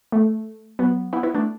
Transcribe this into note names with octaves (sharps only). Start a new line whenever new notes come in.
A3
F#3 B3
B3 E4
B3 E4
A3 D4